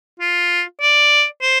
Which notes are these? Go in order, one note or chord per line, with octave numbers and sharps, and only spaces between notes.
F4
D5
C5